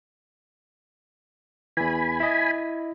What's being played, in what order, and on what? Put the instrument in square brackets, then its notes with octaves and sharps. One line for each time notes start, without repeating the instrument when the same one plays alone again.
[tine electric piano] E2 E3 [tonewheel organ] G#5 B5
[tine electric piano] E4 D#5